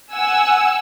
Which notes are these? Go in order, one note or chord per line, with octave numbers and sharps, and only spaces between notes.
F#5 G#5 E6